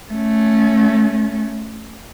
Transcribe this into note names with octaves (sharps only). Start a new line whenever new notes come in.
A3 C#4